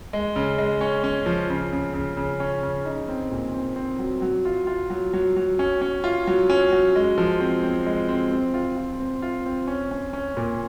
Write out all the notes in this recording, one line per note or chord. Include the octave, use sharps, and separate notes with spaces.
G#3
C#3
G#3
C#4
C#4
F3
C#3
C#3
C#3
C#3
C#4
C#3
D#4
C4
A#2
C4
C4
F#3
F#3
F4
F4
F#3
F#3
F#3
C#4
C#4
F4
F#3
C#4
F#3
G#3
F3
C4
C4
G#3
C4
C4
F4
F4
C4
F4
C4
C#4
C#4
C#4
A#2